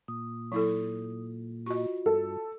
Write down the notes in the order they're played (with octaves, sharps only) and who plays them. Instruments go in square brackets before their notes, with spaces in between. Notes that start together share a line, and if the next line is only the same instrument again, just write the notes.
[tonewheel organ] A#2 [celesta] D#6
[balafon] F#3 E4 A4
[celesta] F4 F#4 [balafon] D#5 C#6
[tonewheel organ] G2 [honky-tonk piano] A4